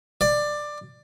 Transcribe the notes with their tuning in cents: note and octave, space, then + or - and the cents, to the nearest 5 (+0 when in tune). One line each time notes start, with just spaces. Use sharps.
D5 +15